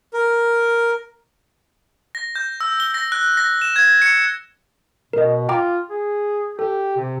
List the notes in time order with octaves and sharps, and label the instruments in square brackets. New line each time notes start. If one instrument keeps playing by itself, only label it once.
[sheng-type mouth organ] A#4
[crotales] A#6
G6
E6
G7
A#6
F#6
A#6
E7
G#6
C#7
[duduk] B2 [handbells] A#4 D#5
[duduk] F4 [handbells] G5 A#5 D6
[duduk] G#4
[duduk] G4 [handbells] A4
[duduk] C3